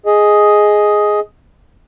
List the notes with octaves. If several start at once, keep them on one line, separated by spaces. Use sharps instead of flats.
G#4 D#5